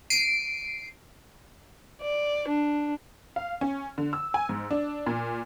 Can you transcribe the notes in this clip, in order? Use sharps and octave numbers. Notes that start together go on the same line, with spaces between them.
C7 D7 D#7
D5
D4
F5
C#4
D3
E6
G#5
G#2
D4
A#2